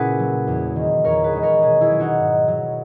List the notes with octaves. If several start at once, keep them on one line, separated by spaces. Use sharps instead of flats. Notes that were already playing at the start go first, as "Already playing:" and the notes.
Already playing: A#2 C#3 E4 F#4 G#4 B4
F#3
E2
D#3 G#3
E2 A#4 C#5
G#4 B4
D#3 G#3
A#4 C#5
B2 G#4 B4
E4 G#4
F#3
D#4 F#4
G#2
F#3